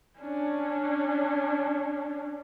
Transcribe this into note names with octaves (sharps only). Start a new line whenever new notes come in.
C#4 D4